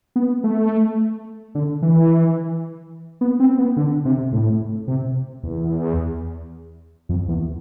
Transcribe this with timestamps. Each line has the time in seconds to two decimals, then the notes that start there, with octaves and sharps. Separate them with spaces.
0.16 B3
0.44 A3
1.55 D3
1.82 E3
3.21 B3
3.40 C4
3.58 B3
3.77 D3
4.05 C3
4.33 A2
4.88 C3
5.44 E2
7.09 F2
7.28 E2